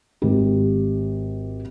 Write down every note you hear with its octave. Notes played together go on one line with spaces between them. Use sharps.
G#1 G4